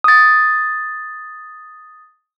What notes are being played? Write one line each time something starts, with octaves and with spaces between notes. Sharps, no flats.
D#6 A6